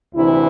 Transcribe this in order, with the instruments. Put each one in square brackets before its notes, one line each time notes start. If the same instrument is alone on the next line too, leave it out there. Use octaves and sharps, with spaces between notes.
[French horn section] D2 C3 E3 E4